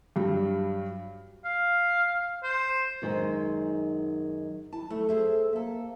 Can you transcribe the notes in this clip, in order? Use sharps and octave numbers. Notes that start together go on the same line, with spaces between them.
G2 F#3 G3
F5
C5
F#2 D#3 G#3 G#4 C5
E4 A5
A3 A4
G#4 C5 E5
A#3 A4 E5